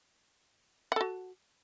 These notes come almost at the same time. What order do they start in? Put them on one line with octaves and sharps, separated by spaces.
F#5 A4 F#4